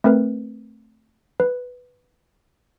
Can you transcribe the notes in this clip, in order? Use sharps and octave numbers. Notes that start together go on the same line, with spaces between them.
A3 C4 A#4 B4
B4